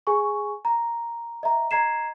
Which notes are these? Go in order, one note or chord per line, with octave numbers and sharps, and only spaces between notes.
G#4 G#5 C#6
A#5
D#5 E5 A#5
D#5 A#5 G#6 C7 E7